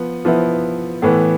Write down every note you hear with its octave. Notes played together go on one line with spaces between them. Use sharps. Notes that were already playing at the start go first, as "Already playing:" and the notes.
Already playing: F3 B3
F3 B3 E4
A2 E3 B3